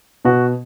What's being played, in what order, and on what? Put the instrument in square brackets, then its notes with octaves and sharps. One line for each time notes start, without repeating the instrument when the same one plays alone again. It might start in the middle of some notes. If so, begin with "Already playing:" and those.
[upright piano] B2 F#4